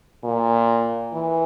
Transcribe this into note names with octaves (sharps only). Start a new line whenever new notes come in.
A#2
E3